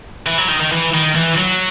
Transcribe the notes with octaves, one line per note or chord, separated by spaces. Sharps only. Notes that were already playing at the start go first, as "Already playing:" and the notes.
E3
F#3
D#3
D#3
E3
D#3
E3
F#3